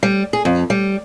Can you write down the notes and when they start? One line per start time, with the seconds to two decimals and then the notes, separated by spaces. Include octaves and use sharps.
0.03 G3
0.33 G#4
0.45 F2
0.70 G3